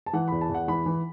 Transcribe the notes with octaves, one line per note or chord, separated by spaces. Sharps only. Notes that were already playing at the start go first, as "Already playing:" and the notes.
A5
E3 F#5
E2 B5
A5
E2
F#5
E3 B5
E3